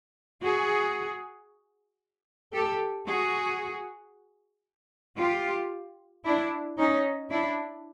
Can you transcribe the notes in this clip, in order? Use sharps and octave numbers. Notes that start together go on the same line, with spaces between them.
F#4 G#4
G4 A4
F#4 G#4
F4 G4
D4 E4
C#4 D#4
D4 E4